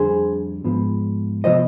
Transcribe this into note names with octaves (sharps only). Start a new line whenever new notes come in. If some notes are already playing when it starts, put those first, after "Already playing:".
Already playing: F2 D3 G3 G#4 C5
G#2 F3 B3
C3 F3 B3 C5 D#5